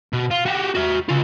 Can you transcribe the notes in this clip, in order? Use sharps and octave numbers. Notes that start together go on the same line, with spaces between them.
B2
F4
F#4 G4
F#4 E5
C#3 F4